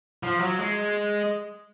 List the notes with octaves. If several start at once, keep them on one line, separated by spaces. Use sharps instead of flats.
F3
F#3
G#3